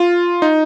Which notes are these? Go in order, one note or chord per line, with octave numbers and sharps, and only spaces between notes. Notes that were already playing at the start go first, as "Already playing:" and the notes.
Already playing: F4
D#4